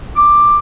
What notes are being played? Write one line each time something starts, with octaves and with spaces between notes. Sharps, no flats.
D6